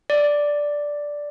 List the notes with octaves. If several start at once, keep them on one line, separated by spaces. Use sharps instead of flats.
D5